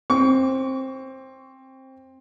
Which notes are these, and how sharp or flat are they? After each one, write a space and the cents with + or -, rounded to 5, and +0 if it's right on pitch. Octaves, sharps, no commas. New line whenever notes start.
C4 +15 C#6 +35